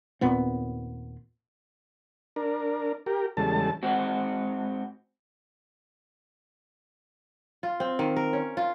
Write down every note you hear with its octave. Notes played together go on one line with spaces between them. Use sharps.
D#2 A#2 B3 C4
D4 A#4
G4 A#4
E2 C#3 G3 G#3 A4 A5
G#2 C4 F#4
F4
C4
D#3
A#4
C#4
F4